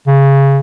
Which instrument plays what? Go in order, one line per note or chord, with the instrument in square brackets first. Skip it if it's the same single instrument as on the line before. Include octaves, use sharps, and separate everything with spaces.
[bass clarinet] C#3